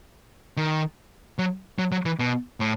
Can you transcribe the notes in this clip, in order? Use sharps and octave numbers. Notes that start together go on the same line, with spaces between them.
D#3
F#3
F#3
F#3
E3
B2
A2